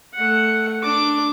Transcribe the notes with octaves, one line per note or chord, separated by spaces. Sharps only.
A3 F#5
D4 D6